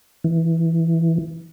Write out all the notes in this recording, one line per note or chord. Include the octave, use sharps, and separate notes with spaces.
E3